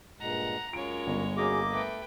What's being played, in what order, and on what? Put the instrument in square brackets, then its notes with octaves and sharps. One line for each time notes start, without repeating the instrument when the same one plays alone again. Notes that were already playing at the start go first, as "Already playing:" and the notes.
[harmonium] G2 A#2 G#3 [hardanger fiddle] F#5 A#5
[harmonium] F#2 F4 A#5 [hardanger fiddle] G#3 C#5 [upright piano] D7
[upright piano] G1
[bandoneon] A#3 D#5 D6 [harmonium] C#4 F#4 G#4
[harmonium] A3 A4 [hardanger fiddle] B4 G5